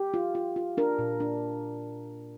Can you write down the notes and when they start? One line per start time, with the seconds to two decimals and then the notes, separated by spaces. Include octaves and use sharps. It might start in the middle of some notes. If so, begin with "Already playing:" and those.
Already playing: G4
0.14 F4
0.35 F4
0.56 F4
0.77 D4 A#4
0.98 A#2
1.20 D4